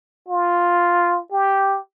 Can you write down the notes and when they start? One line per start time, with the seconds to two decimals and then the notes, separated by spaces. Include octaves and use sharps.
0.29 F4
1.32 G4